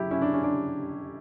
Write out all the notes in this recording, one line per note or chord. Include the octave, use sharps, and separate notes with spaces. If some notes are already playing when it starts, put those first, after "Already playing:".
Already playing: C#3 F#3 E4 G4
C#4 E4
D4
C#4
D4